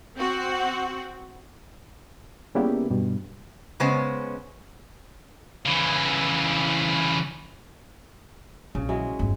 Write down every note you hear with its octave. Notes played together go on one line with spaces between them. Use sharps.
C4 F#4
C#3 G3 A#3 B3 E4 G4
G2 B2
C#3 G#3 B3 C#4 C5
C#3 E3
A#1 C#3
F#3 G#3 E4
G1 F2